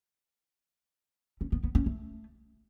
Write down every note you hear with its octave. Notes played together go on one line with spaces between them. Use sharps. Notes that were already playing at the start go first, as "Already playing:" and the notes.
C#4
B3
B3
C#4
A3